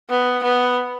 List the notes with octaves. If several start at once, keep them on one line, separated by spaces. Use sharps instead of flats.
B3
B3